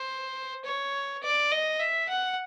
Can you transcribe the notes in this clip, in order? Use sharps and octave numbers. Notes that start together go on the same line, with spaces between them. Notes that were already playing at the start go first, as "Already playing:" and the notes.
Already playing: C5
C#5
D5
D#5
E5
F#5